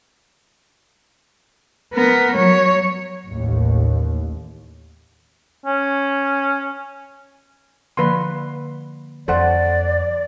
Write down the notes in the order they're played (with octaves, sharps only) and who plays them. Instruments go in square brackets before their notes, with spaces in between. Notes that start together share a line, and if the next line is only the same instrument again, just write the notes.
[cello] B3 A#4
F#3 C#5
[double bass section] A1 D#2
[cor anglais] C#4
[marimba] D3 F3 A#3 [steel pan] B4 C6
[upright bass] F2 [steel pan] A4 C5 F#5 [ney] D5